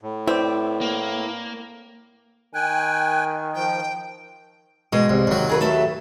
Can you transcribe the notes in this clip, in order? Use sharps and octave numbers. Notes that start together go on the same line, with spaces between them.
A2
C4 E4 B4 D5
A#3
D#3 G5 G#5 F#6
F3 G5
B2 G#3
C2
D#2 F#3
G#4 A#4 B4
A3 A4 E5